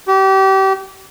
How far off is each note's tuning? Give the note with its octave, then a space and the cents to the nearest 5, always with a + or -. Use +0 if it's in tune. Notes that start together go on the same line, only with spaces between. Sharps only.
G4 -30